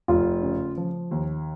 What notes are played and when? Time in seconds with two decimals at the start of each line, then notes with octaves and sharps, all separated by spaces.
0.08 F1 F4
0.42 C#3
0.77 F3
1.11 D#2